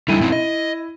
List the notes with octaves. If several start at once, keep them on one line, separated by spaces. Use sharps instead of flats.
D3 G3 D#4 E4 D#7
B2 C4 D#4
D#5